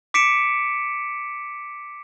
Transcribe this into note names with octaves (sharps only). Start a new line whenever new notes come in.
D6 B6 C#7 D7 E7